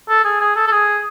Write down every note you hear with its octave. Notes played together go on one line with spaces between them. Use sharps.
A4
G#4
G#4
A4
A4
G#4